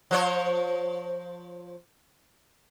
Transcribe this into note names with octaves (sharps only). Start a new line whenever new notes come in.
F3 C5 C#5